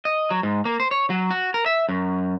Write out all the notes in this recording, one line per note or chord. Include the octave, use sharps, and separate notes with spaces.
D#5
F#3
G#2
A#3
C5
C#5
F#3
F#4
A#4
E5
F#2